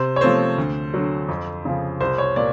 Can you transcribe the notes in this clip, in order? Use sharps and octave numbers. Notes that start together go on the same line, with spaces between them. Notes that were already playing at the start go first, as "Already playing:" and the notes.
Already playing: C3 C5
C#5
F3 A3 C4 C5
D2
D3 F#3
F2
C#3 F3
C2 C5
C#5
A#2 D5